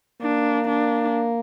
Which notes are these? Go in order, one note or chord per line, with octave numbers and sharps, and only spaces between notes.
A#3 D4
D4